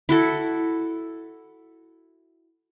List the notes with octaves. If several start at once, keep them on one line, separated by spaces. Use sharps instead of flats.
E4 F#4 A4